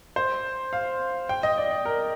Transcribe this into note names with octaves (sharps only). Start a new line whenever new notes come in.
C5
F5
G5
D#5
D5
D5
A#4